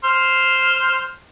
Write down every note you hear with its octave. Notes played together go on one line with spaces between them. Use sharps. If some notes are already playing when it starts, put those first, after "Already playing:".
C5 C6 F6